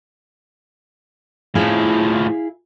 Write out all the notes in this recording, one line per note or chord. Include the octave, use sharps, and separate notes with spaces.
A2 F3 E4 G#4 F5